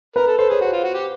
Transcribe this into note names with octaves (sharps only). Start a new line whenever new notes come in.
A#4 B4
A4
A4 C5
G#4 C#5
F#4 C5
F4
F#4
G4